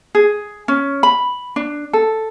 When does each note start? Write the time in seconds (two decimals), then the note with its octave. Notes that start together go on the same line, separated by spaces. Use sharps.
0.15 G#4
0.68 C#4
1.03 B5
1.56 D4
1.93 A4